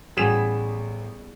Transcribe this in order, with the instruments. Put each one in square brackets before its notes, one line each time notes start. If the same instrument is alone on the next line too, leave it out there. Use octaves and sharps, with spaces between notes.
[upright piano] A1 B6 E7 [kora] G3 B3 G#4